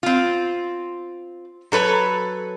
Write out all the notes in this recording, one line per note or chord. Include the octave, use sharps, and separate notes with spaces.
C4 F4
F#3 A4 B4 C#5